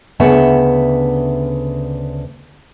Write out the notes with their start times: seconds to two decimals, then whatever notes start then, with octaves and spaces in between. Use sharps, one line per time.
0.20 D2 C#3 B3 C#5 E5